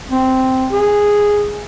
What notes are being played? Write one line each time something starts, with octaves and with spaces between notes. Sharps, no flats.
C4
G#4